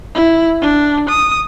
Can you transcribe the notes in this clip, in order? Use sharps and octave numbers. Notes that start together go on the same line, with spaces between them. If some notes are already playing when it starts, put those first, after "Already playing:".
E4
D4
D#6